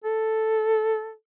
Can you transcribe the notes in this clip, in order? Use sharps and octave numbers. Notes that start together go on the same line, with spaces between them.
A4